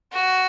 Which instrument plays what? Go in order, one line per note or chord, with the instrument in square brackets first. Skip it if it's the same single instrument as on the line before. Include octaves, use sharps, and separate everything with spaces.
[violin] F#4